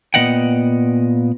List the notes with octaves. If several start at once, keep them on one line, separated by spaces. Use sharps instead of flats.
A#2 A3 B3 D#5 F#5 G5